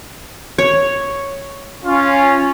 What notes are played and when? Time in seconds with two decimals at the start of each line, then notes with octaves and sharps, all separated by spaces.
0.58 C#5
1.85 C#4 F4